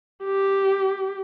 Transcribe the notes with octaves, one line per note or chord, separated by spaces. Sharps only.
G4